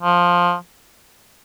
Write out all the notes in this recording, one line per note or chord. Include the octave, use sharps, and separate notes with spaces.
F3